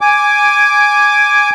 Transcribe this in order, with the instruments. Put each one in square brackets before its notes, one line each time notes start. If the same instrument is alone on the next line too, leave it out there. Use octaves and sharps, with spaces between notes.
[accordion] G#5 D6